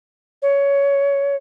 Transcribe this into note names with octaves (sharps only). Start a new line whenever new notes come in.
C#5